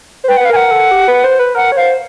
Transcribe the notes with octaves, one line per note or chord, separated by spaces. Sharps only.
C5
B4 G5
F#5
B4
F5
A#4 G#5
F#5
A4
G4
B4
C5
B4
A#4 F#5
C#5
C5 F5